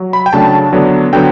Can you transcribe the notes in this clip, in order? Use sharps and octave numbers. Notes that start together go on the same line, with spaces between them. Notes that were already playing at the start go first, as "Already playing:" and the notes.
Already playing: F#3
B5
G5
C#3 F#3 A3 D4 A5
D3 F#3 B3 D4
D3 F#3 B3 G5